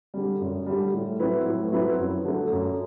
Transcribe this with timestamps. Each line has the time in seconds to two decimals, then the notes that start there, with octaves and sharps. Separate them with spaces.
0.14 D3 G3
0.40 F#2
0.66 D3 G3
0.93 A2
1.20 F#3 C4 E4 B4
1.46 A2
1.72 F#3 C4 E4 B4
1.98 F#2
2.25 D3 F#3 A3
2.52 F#2